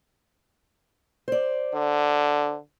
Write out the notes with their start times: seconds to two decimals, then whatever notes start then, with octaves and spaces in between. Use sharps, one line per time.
1.28 C5 D5
1.74 D3